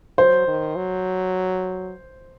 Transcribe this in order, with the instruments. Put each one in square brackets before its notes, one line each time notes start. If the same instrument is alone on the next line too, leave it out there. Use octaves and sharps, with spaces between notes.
[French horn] F#3 [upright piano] C5
[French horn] D#3
F#3